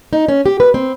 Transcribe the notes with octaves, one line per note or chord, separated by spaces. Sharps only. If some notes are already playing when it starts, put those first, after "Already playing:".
D#4
C#4
G4
B4
C4